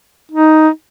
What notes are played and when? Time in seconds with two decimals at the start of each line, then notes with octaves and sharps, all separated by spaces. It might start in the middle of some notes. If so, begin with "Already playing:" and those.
0.31 D#4